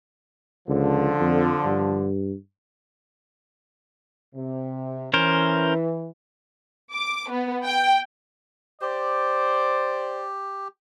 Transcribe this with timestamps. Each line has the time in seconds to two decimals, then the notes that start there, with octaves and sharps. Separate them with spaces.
0.69 C#2 D3 F3
1.20 F2
1.65 G2
4.34 C3
5.14 E3 C#4 A#4 C5
6.93 D6
7.30 B3
7.64 G5
8.81 G4 C5 D5